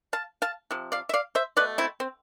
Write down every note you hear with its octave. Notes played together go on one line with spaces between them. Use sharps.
F5 A5
F5 A5
C3 F3
D5 F5
E5
D5 F5
C5 E5
B2 A3 B4 D5
C4 E4
C4